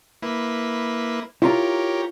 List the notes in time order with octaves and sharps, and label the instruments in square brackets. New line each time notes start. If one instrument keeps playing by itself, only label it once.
[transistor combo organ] A#3 E4 B4
[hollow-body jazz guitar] E4 F4 A#5 [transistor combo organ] G4 A#4 C#5